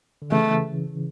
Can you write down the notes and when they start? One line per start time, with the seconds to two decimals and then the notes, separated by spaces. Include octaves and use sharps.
0.22 D3
0.31 C#3 E3 A3